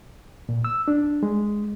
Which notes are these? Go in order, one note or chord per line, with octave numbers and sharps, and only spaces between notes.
A#2
E6
D4
G#3